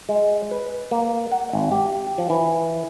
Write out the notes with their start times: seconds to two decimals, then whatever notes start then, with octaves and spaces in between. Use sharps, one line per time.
0.09 G#3
0.51 B4
0.91 A#3
1.32 F#5
1.53 G#1
1.71 G4
2.18 F3
2.30 E3